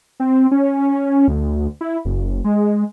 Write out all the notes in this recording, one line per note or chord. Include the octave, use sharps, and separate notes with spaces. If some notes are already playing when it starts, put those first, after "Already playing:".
C4
C#4
D2
E4
F#1
G#3